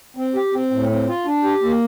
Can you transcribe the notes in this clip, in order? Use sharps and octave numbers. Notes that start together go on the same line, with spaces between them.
C4
G4
C4
A2
C4
F4
D4
G4
A#3